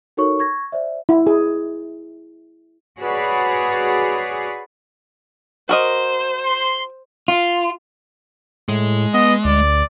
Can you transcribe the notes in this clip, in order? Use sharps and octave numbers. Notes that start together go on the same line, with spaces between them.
D#4 F#4 A4 A#4 C#5 C#6
C#6 G#6 A#6
C5 D5 E5
E4
G#4
F#4 G#4 B4 C#5 D5
F#4 A#4 C5 D#5
C6
F4
A2 G#3
B3 D#5
D2 D5